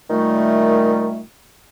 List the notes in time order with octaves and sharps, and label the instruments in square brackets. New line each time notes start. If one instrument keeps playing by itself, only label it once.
[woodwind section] A#2 D#3 G3 A3